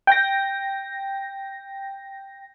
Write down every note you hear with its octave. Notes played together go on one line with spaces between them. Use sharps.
G5 A#6